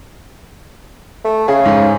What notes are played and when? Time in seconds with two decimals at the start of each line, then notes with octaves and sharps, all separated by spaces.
1.24 A3
1.48 C#3 G#4
1.65 G#2